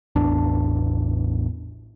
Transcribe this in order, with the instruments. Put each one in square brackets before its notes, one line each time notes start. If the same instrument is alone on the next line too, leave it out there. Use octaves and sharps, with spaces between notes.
[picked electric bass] A1 E2 D4